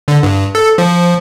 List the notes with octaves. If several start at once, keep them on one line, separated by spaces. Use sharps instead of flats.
D3
G2
A4
F3